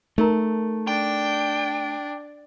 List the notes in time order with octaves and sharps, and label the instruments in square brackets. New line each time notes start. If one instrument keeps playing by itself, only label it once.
[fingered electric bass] A3 [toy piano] D#4 A#4 A#5
[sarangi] D4 [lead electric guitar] G5